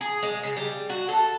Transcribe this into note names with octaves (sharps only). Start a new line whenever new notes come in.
G#4
G#3
C#3
G3
F#4
A4